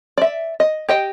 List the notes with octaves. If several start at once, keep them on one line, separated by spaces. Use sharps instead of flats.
D5 E5
D#5
G4 D#5 G5